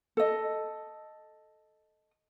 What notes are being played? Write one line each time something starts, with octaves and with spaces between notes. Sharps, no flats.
A4 D#5